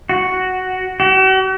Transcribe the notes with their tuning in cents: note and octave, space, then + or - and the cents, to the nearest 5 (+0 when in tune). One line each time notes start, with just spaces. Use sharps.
F#4 +5
F#4 +45